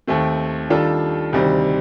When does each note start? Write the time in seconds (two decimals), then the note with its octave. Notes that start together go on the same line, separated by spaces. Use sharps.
0.07 D#2 D#3 A3 C4
0.70 D#3 G3 D4 F4 A4
1.33 D2 C3 D#3 G3 C4